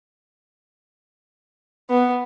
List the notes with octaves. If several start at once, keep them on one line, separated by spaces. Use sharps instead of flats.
B3